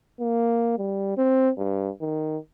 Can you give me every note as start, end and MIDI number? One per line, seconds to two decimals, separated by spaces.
0.20 0.77 58
0.78 1.13 55
1.17 1.51 60
1.58 1.90 43
2.01 2.38 51